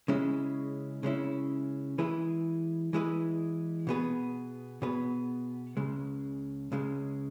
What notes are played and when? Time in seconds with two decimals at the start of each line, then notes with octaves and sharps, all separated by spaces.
0.08 C#3 G#3 C#4 E4
1.03 C#3 G#3 C#4 E4
1.98 E3 G#3 E4 G#4 B4
2.93 E3 G#3 E4 G#4 B4
3.87 B2 B3 G#4 B4
4.82 B2 B3 G#4 B4
5.77 C#2 C#3 G#3
6.72 C#2 C#3 G#3